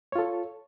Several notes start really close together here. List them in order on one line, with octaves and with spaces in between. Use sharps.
C#5 F4 A4